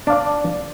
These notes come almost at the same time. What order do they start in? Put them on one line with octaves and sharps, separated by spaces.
D4 F5 D5